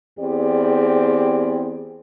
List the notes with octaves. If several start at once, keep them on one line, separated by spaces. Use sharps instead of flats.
E2 C4 G4 G#4 D5